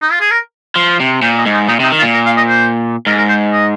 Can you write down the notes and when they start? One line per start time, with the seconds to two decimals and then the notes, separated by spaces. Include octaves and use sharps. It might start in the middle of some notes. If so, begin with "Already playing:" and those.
0.02 D#4
0.11 F4
0.21 G#4
0.31 A#4
0.76 F3
1.00 C3
1.22 A#2 C5
1.38 D#5
1.46 G#2
1.53 D#4
1.68 A#2 D#4
1.80 C3 D#4
1.92 D#3
1.99 F4
2.02 A#2
2.13 A#4
2.26 F5
2.37 D#5
2.48 C5
3.06 G#2 A#4
3.18 A#4
3.29 C5
3.52 D#5